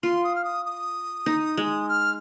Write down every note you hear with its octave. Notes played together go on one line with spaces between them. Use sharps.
F4 C6
D#6
F6
D#6
D#6
D#4
G#3
F6